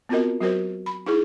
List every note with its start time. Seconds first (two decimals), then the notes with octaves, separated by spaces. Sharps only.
0.09 B3 C4 F4 F#4 A#4 D#5
0.41 F#3 F#4 A#4 C5
0.86 B5
1.06 D#4 E4 G#4